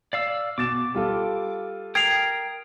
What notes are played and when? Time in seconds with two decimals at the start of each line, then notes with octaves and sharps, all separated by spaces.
0.13 D5 F5 E6
0.58 B2 D6 A6 E7
0.95 G3 F4 A4
1.95 A#4 G5 D#6 G#6 C7 F7